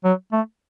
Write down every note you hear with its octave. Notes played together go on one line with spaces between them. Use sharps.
F#3
A3